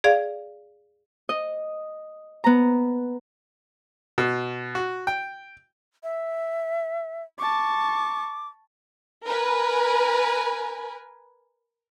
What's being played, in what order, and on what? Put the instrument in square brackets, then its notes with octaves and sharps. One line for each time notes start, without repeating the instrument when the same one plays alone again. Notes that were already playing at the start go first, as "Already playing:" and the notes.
[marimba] G#4 D5 F5
[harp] D#5
B3 A#5
[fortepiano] B2
F#4
G5
[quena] E5
[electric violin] A5 C#6 [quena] D6
[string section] A#4 B4 G#5